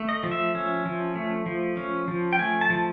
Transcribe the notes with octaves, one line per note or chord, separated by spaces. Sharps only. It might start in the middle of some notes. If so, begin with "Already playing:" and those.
Already playing: A3
D#5
F3
E5
C#4
F3
A3
F3
C#4
F3
G5
A3 G#5
A5
F3